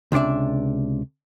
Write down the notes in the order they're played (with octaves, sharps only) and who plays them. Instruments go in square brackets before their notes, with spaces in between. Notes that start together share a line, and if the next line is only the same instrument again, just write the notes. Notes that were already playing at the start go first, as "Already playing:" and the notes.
[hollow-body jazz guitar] C#2 C3 D4 D5 E5